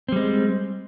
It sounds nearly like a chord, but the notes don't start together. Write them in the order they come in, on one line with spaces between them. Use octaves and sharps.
C4 G3 G#3